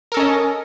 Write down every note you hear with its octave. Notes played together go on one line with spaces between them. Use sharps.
C#4 A4 A#4 D#5